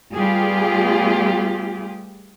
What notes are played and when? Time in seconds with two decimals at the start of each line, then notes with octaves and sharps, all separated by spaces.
0.13 G3 A3 B3 F4 G4 G#4